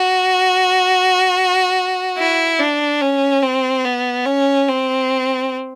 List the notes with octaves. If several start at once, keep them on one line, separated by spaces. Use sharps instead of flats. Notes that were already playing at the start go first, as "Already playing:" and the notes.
Already playing: F#4
E4
D4
C#4
C4
B3
C#4
C4